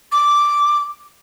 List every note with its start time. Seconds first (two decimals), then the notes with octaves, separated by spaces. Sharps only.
0.12 D6